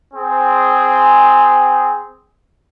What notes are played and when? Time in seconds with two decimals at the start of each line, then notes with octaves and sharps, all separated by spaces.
0.14 C4 G#4